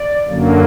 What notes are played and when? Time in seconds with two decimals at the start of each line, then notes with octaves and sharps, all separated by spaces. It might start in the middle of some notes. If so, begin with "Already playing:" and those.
Already playing: D5
0.28 F#2 D3 F#3 A#3